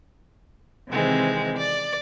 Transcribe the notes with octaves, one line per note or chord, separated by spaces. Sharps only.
C3 D#3 E3 G#3 C4
D5 A6